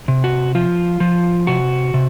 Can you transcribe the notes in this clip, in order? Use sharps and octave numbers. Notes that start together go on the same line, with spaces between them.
C3
F#4
F3 F4
F3
C3 F#4
C3